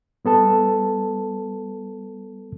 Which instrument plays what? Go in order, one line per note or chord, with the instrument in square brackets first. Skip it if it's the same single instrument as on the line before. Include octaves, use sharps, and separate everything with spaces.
[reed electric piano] G3 B3 A4 A5